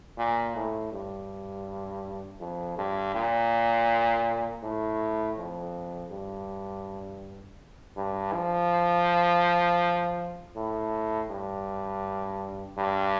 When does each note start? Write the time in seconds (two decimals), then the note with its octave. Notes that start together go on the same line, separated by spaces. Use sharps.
0.18 A#2
0.55 A2
0.92 G2
2.40 F2
2.78 G2
3.14 A#2
4.63 A2
5.37 F2
6.11 G2
7.97 G2
8.33 F3
10.56 A2
11.30 G2
12.78 G2